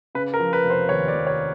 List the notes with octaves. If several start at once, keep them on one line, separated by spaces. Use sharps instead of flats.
C#3 B4
A#4
F3
B4
F1
C5
D#2 C#5
D5
F1
C#5